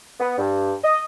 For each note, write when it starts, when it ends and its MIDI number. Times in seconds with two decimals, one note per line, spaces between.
0.20 0.36 59
0.38 0.73 43
0.84 1.02 75